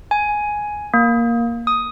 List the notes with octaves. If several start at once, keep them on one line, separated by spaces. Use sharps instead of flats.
G#5
A#3
D#6